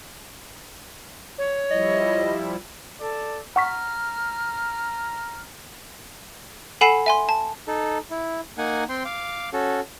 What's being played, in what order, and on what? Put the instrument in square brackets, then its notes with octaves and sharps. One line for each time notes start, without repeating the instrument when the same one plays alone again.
[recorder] C#5
[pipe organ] F3 G3 E4 [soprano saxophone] D#5
[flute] A4 [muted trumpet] D5
[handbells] F#5 C#6 B6 [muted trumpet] A#5 [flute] F6
[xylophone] A4 F#5 G#5 B5 C7 E7
E5 G#5 C6
A5
[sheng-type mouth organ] D#4 A4
E4
A#3 D#4 F#5 G#5
C4 G5 C6
F5 D6
C#4 F#4 A4